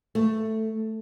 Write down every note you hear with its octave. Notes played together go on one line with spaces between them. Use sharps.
A3